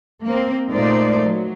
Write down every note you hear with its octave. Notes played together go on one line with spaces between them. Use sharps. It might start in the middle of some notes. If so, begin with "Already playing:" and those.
A#3 C4
A#2 G#3 A3 D#4 C5 D5
F#3